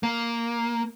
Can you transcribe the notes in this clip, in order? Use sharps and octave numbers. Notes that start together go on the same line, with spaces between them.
A#3